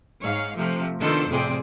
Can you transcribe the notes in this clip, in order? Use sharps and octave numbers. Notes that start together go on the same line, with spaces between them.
G#2 C#5 F5
C3 F3 A3
D#3 B3 D4 F4 A4 C5
F2 A2 C3 C4 G#4 D5